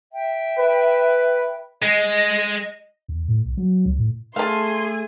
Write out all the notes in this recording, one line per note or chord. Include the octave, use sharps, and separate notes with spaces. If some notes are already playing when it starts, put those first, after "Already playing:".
E5 G5
B4
G#3 D#5
E2
A2
B1
F#3
C#2
A2
A3 G#4 F5 G#5 A5 C6